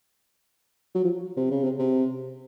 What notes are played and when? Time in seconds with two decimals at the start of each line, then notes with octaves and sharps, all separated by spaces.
0.95 F#3
1.05 F3
1.37 C3
1.51 C#3
1.64 C3
1.79 C3